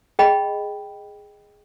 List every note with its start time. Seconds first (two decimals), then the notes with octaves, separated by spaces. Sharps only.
0.19 G#4 D#5 G5 B5